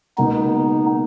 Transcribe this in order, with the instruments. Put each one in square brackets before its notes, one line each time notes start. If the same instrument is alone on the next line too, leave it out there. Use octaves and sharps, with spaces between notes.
[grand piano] C#2 B2 A#3 [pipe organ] B3 D#4